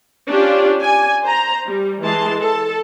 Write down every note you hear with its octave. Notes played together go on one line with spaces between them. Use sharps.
C#4 D4 F4 G4
D5 G#5
C5 A#5
G3
E3 G#3 A5 C6
A4 A5